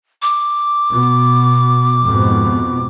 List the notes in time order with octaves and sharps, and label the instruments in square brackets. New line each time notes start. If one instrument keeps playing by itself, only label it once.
[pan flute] D6
[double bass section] B2
F2 G#2 B2